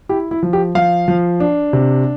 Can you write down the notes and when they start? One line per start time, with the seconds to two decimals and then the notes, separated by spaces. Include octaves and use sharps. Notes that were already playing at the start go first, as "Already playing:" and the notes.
0.09 E4 G4
0.31 E4
0.43 F3
0.53 G4
0.75 F3 F5
1.08 F3
1.40 D4
1.73 C3